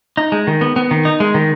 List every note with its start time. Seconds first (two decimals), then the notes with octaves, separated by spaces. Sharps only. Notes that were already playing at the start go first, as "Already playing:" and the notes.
0.17 D#4
0.32 G#3
0.47 D#3
0.61 B3
0.76 B3
0.91 D#3
1.05 D#4
1.20 G#3
1.34 D#3